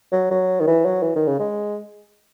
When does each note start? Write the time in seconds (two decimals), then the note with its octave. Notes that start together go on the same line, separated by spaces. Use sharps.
0.12 F#3
0.31 F#3
0.61 D#3
0.67 E3
0.85 F#3
1.03 E3
1.16 D#3
1.27 C#3
1.39 G#3